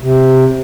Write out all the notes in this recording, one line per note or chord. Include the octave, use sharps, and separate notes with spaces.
C3